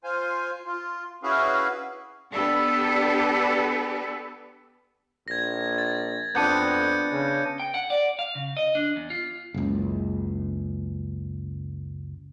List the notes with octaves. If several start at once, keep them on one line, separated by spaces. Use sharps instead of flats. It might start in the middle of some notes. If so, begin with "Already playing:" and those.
F4 C5 F5 G#5
F4
C#4 E4 F#4 G#4 B4 F5
B3 D4 G4 A4 B4
A#1 G#6 A#6
A6
F2 B3 D4 G5 G6 C#7 D#7
C#3
G5
F#5
D5
F5
C#3
D#5
D4
E2
F4
F#1 C#2